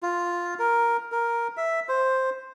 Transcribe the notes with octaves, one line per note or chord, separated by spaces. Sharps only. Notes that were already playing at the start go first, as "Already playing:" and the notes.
F4
A#4
A#4
E5
C5